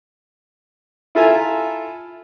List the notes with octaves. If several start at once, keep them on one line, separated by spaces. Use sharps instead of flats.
E4 F4 A4 E5 G#5 A#5